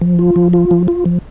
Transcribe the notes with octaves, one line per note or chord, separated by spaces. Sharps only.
F3
F4
F3
F4
F3
F4
F3